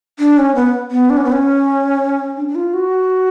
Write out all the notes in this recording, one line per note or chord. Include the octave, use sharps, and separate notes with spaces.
D4
C#4
B3
B3
D4
C#4
B3
C#4
D4
D4
F4
F#4